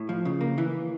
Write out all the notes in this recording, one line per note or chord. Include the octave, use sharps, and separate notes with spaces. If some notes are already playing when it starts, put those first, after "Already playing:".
Already playing: A2
F3
C#3
A#3
E3